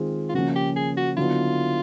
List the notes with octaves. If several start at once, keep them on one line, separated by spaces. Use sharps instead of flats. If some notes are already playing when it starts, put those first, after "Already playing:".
Already playing: D#3 G#3 C4 F4 G#4
F4
C#3 F3 A#3 C#4 F#4
G4
G#4
F#4
D3 F#3 B3 E4 F4